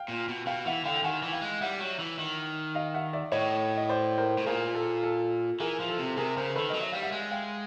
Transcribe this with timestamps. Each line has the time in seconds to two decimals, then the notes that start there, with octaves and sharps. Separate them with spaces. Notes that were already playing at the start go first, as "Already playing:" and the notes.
Already playing: F5 G5
0.08 A#2
0.29 B2
0.46 B2 F5 G5
0.65 E3 E5 F#5
0.84 D3 F5 G5
0.96 G5
1.03 D#3 F#5 G#5
1.22 E3
1.33 F5 G5
1.41 G#3
1.61 G3 E5 F#5
1.80 F#3
1.99 E3
2.19 D#3
2.75 D#5 F5
2.94 E5 F#5
3.13 D5 E5
3.32 A2 C#5 D#5
3.77 D#5
3.89 C5 D5
4.18 A#4 C5
4.38 A2
4.46 A#2 G#4 A#4
4.75 A4
5.03 A4
5.60 E3 G#4 A#4
5.80 F3
5.89 A4
5.98 C3
6.17 C3 G#4 A#4
6.36 C#3 A#4 C5
6.55 D#3 A4 B4
6.70 F#3 D#5
6.81 E5
6.92 G3 F5
7.03 E5 F#5
7.12 G#3
7.32 F5 G5